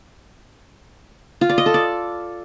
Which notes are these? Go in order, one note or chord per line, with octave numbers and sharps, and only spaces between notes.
F4
D5
D#5
A4
D5